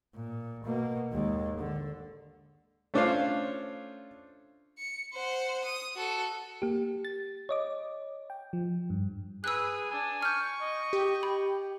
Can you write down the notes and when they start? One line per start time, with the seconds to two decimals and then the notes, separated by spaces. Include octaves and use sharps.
0.14 A#2
0.64 B2 A#3
1.12 D#2 G#3
1.58 D3
2.94 A3 C#4 D4 F4 C5 F5
4.78 C#7
5.14 C5 F#5
5.64 D#6
5.95 F#4 A4
6.62 A#3 G4
7.05 A6
7.49 C#5 D#5 D6
8.30 G5
8.53 F3
8.90 G2
9.44 G#4 B4 E6 F#6
9.91 D4 G#5
10.22 C#6 F6 G6
10.61 D#5
10.93 G4
11.23 B5